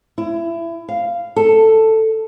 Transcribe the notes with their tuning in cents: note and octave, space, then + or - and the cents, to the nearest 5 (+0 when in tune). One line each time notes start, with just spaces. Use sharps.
E4 +25
F5 -10
A4 +5